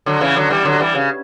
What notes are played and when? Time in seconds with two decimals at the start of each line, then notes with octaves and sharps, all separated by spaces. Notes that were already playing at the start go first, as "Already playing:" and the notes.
0.06 D3 F#3
0.21 C#3 E3
0.36 D3 F#3
0.50 E3 G3
0.65 D3 F#3
0.80 E3 G3
0.95 C#3